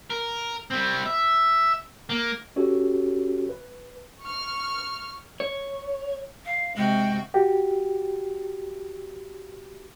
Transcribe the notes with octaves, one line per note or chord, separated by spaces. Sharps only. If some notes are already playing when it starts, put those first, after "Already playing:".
A#4
G3 C4
E5
A#3
C#4 F#4 G4 A4 C#5
B4
C#6 F6
C#5
F5
C3 G#3 F#4 G5
F#4 G4